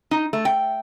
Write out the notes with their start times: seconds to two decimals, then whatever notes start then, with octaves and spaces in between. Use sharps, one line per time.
0.11 D#4
0.33 A3
0.45 G5